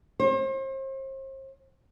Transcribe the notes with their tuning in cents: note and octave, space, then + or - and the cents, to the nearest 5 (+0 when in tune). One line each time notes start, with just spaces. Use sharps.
C5 +40